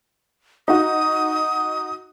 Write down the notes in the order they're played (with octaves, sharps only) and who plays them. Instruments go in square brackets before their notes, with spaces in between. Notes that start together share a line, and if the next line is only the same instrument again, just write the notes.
[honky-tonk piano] D#4 F#4 [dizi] D#6